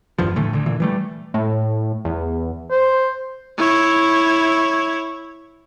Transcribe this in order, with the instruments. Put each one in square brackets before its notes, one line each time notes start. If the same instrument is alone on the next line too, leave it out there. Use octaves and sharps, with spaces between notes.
[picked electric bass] G#1 E2 G2 F3
A2 D3 E3 A3
D2 D3
A#2 D3 E3
E3 G3 A3
[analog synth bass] A2
E2
[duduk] C5
[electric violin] E4 C#5